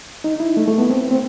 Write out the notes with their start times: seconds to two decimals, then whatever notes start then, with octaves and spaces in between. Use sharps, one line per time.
0.24 D#4
0.40 E4
0.57 A3
0.67 A3
0.78 B3
0.90 C4
1.11 C4